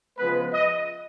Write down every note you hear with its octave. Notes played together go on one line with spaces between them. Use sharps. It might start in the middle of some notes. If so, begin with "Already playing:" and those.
C#3 F3 G#3 B3 B4
D#5